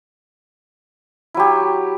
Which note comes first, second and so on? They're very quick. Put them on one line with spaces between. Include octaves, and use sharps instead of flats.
E4 F#3 G4